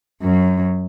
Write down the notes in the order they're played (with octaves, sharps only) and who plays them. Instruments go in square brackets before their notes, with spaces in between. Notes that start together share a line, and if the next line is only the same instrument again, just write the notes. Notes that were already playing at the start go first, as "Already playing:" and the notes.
[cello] F#2